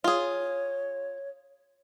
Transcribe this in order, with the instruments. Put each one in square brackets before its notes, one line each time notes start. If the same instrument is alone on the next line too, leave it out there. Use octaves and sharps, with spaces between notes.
[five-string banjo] F4 G#4 [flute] C#5